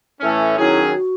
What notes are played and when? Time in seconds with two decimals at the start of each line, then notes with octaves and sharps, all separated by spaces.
0.21 A2 E3 A3 C#4
0.56 D#3 F#3 C#4 E4 G#4
0.92 F#4